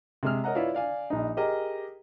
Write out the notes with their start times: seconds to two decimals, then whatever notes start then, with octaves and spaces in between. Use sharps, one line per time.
0.23 C3 G#3 G#4 F6
0.44 A#4 C#5 D#5 F#5 A#5
0.55 E4 F4 B4 C#5 D5 F5
0.74 D5 F5 G#5
1.10 A#1 D#4
1.37 G4 G#4 A#4 D#5 A#5